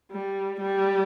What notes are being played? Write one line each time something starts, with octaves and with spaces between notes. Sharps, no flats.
G3
G3